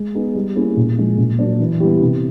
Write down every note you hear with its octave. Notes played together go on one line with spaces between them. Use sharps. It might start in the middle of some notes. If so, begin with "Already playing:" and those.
Already playing: G#3
B3 D#4 G#4
G3
A#3 C#4 E4 G#4
A#2
F3 G#3
A#2
F#3 A#3 D4
E3
G3 B3 E4 G4
C3